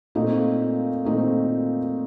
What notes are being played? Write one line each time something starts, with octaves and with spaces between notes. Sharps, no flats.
A#2 A3 C4 D#4
A#2 A3 C4 D#4